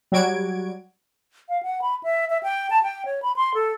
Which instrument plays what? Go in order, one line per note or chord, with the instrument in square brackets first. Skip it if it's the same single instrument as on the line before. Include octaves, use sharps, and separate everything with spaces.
[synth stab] F#3 G3 F#4 G#6 D7
[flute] F5
F#5
B5
E5
E5
G5
A5
G5
C#5
B5
C6
A4